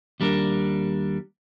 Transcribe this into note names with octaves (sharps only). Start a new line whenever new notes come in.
D#2 G3 D4 A#4